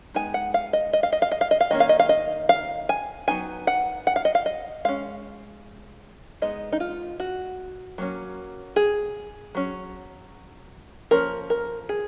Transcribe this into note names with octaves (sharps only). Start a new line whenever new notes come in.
G#3 B3 D#4 G#5
F#5
F5
D#5
D#5
F5
D#5
F5
D#5
F5
D#5
F5
D#3 A#3 C#4 D#5
F5
D#5
F5
D#5
F5
G#5
F#3 B3 D#4 G#5
F#5
F#5
F5
D#5
F5
D#5
G#3 C#4 F5
G#3 B3 D#4 D#5
D#4
F4
F#4
F#3 A#3 C#4
G#4
F#3 C#4
F3 A#3 C#4 A#4
A#4
G#4